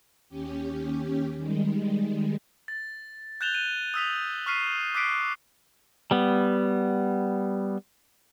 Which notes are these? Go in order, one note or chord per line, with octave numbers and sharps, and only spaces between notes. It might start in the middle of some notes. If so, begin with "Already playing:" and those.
D#2 C#4 G4
D#3 G3 G#3
A6
F#6 G6 A6 E7 F7 G7
D#7
D#6 E6 B6 F7
C#6 F6 B6 C7 D#7
D6 E6 F#6 B6 C7 D7
G3 B3